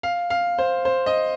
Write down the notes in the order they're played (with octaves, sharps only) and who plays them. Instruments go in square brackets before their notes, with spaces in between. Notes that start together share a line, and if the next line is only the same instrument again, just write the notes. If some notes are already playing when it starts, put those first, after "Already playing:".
[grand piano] F5
F5
C5
C5
D#5